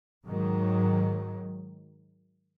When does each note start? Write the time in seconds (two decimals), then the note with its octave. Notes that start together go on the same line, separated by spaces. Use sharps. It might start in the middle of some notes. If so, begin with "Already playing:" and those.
0.24 G#2 D#3 F#3